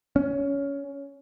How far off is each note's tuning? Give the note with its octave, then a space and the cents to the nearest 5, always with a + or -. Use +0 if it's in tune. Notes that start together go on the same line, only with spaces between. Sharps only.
C#4 +15